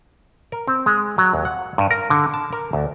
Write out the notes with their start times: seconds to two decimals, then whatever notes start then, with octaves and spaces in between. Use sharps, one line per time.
0.52 A#4
0.68 C4
0.86 G#3
1.18 F#3
1.33 D#2
1.45 F#5
1.78 G2
1.91 A#4
2.10 D3
2.34 A5
2.53 A#4
2.73 D2